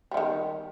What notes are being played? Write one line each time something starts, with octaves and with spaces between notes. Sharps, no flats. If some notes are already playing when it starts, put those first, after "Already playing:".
D#3 E3 G3